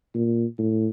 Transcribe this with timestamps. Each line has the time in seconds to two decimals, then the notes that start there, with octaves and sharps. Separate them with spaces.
0.14 A#2
0.58 A2